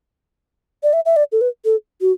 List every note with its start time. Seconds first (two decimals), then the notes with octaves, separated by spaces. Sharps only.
0.83 D5
0.93 E5
1.05 E5
1.16 D5
1.32 A4
1.41 B4
1.65 A4
2.01 F#4